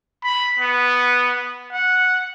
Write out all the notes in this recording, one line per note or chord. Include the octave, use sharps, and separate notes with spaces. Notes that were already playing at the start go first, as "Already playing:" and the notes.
B5
B3
F#5